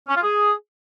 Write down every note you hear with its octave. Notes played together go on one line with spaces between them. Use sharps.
C#4
F4
G#4